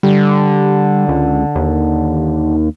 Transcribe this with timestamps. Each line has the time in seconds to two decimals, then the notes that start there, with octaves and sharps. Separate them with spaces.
0.03 D3 G3
1.08 C#2
1.55 D#2